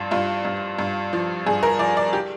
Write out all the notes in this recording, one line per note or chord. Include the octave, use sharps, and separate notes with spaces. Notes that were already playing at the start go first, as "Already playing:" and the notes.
Already playing: G2 F3 F4
G2 F4
G2
G2
F3
G2 G#4
A#4
F3 D5
D5
G4